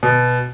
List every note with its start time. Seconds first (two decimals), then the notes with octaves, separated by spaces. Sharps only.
0.03 B2